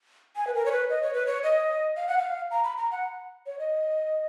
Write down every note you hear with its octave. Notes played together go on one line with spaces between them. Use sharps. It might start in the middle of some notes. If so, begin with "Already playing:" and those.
G#5
B4
A#4
C#5
B4
D#5
C#5
B4
C#5
D#5
F5
F#5
F5
A#5
B5
A#5
F#5
C#5
D#5